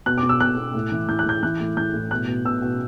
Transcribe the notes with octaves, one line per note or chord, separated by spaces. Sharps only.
B2 F#6
D6
B2
E6
B2 F#6
B2
A2
E3
E3 G6
F#6
E3 G6
E3 F#6
A2
E3 G6
A2
B2 F#6
B2
B2 E6
B2